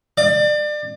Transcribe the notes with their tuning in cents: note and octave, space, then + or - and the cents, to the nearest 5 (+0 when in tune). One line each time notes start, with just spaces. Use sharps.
D5 +30